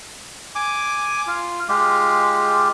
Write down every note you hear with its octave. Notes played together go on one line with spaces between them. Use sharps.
G#5 D6
F4
G#3 F4 G4